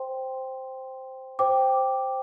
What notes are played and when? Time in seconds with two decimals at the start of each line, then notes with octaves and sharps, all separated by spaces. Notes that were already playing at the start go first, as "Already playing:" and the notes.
Already playing: C5 G5 C6
1.39 C5 G5 D6